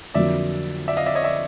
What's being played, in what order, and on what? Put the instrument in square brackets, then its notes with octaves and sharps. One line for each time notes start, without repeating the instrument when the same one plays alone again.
[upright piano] F2 D3 F#3 A#3 [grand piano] D5 E5
[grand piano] D5 E5
D#5 F5
D5 E5
C#5 D#5
D5 E5